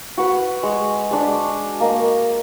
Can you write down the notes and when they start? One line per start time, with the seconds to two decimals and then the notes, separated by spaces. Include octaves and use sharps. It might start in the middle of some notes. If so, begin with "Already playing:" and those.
0.18 F#4 B4
0.63 G#3
1.11 G#3 D4 B5
1.80 A#3 D#5